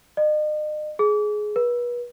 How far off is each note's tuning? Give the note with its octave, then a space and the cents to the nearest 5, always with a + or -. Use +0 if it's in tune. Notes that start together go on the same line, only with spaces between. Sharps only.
D#5 -40
G#4 +15
B4 -35